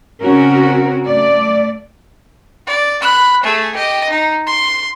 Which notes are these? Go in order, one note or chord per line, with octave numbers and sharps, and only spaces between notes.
C#3 C4 C#4 F#4 A#4
A3 D5
D5
B5 F#6
A3 G#4
G4 D#5
D#4
C6